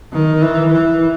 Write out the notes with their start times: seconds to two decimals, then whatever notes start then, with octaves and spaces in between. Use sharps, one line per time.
0.12 D#3
0.42 E3
0.72 E3